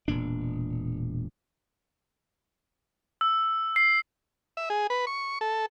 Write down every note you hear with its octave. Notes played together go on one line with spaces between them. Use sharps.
E1 A#2 D4
E6
C7
E5
G#4
B4
C#6
A4